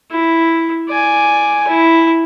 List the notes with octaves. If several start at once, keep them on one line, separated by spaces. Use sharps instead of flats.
E4
D5 G#5
E4